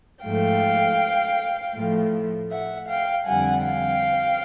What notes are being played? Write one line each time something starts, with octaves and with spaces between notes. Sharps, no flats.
G#2 F3 A3 F5 G5
A2 F3 A3
E5 F#5
F5 G5
F2 D3 G3 F#5 G#5
F5 G5